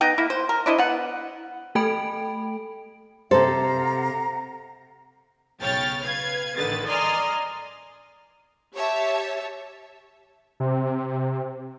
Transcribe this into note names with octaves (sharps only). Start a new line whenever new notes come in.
B3 D#4 D#5 G5
A#3 E4
C5
A#4
D4 E4 C5 D#5
B3 F#5
A3 A4 G5 B5 D7
C3 A4 C5 F5 F#5 A#5
B1 C#3 C#5 G5 F6 A6
B4 F5 G#6
A1 D3 D#3 B4 A6
D5 D#5 G#5 A#5 C6 F6
G4 C#5 E5 A5
C3